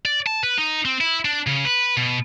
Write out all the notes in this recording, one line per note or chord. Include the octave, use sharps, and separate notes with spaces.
D5
A5
B4
D#4
C4
E4
D4
C#3
B4
B2